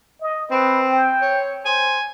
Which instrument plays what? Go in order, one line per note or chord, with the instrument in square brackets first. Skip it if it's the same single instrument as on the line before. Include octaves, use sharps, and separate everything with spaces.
[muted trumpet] D#5
[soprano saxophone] C4 [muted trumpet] B4
[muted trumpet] G5
[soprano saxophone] C#5
[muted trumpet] C5 [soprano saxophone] G#5